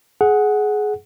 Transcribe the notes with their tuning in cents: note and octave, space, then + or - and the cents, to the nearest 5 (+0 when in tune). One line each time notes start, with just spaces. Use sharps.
G#4 +20 F#5 +0